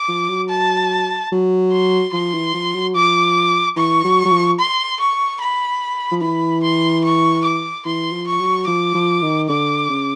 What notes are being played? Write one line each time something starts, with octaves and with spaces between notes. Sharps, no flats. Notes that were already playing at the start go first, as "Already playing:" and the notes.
Already playing: D6
F3
F#3
A5
F#3
C6
F3 C6
E3
F3
F#3
F3 D6
E3 C#6
F#3
F#3
F3
C6
C#6
B5
F3
E3 B5
C6
C#6
D6
E3 C6
F3
C#6
F#3
F3 D6
F3
D#3
D3 D6
C#3